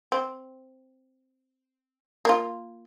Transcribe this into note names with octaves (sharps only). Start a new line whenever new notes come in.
C4
A#3 F4